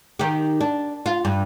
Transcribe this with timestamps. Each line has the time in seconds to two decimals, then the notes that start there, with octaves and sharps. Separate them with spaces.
0.19 D#3 G4
0.61 D4
1.06 F4
1.25 G2